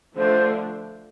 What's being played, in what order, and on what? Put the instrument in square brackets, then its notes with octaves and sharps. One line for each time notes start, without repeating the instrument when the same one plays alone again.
[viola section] D3 F3 A3 D4 [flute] C5